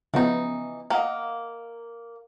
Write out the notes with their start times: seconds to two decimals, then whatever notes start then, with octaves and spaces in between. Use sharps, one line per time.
0.14 C#3 E3 F3 B3 D#4
0.90 A#3 D#5 F5 F#5